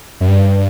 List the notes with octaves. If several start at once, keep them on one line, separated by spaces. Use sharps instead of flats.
F#2
G2